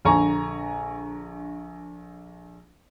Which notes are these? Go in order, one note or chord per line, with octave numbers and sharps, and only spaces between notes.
A#1 D3 G#5 A#5 C#6